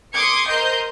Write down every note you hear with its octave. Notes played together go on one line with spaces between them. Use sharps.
C6 D6 D#6 G#6 C#7
A#4 C5 D#5 C6 G6